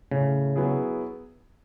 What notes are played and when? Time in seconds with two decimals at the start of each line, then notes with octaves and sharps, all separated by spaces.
0.11 A2 C#3
0.56 F#3 B3 E4 G#4